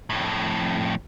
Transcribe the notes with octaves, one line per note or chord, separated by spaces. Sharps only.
F2 A2